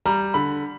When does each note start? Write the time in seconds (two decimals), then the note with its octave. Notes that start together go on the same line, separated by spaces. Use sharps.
0.06 G3 A#5
0.34 D3 B5